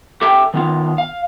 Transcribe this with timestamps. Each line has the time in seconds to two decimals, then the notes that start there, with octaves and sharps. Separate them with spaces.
0.22 G4 A4 E5 G5
0.54 D#3 B3 F4
0.98 F5